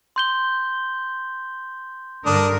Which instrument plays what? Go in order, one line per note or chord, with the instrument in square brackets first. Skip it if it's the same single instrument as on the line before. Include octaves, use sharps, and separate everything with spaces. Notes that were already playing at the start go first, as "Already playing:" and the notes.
[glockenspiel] C6 G6 G7
[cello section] G2 D3 A#4 [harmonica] D4 D#6